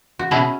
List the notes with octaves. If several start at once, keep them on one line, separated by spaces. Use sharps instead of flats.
F#4
B2 C#4 E4